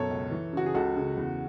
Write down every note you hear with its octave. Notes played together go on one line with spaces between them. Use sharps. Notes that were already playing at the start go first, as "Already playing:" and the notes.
Already playing: F#2 B2 A4 C#5
C#2
E3
C#3 F#4
G#4
C#2 F#4 A4
C#3
E2